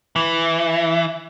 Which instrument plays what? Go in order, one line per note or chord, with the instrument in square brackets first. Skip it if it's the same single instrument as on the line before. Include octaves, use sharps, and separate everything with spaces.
[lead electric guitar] E3